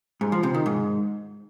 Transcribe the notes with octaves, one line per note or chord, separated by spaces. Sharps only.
G#2
F3
C3
D#3
G#2